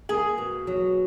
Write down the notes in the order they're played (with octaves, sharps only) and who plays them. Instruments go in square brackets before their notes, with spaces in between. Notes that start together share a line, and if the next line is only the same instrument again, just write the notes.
[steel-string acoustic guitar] A#3 [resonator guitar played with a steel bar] G#4
[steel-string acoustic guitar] B2
F#3